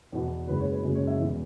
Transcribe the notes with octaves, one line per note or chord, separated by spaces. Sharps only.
E2 B2 B3
F#1 F#2 C#3 G#3 B4
C#5
B4
F#1 F#2 C#3 G#3
C#5
E5
E1 E2 E3